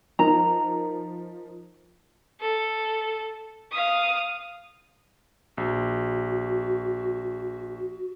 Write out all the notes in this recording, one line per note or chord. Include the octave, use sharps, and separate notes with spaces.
F3 D#4 A#4 A#5
A4
F5 D#6
A#1 F#4